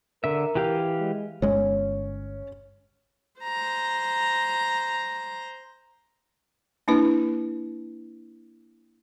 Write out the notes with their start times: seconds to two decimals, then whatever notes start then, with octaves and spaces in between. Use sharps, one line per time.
0.24 D3 A#4 E5
0.55 E3 G4 F5
1.00 G#3
1.42 G1 G#3 C#4
3.41 C5 A#5
6.88 A#3 D4 E4 B4